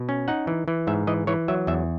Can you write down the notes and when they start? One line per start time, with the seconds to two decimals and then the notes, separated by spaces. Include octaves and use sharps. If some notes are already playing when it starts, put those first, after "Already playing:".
Already playing: B2
0.09 C#4
0.28 D#4 F#5
0.47 E3
0.68 E3
0.87 G#2 E5
1.07 E3 D#5
1.27 E3 C#5
1.48 F#3 E5
1.67 E2 E5